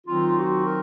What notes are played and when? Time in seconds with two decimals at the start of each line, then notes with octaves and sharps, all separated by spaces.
0.07 D#3 F#3 C4 D#4 F4
0.38 F#4
0.66 A#4